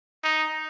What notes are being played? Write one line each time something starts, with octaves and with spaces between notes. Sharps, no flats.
D#4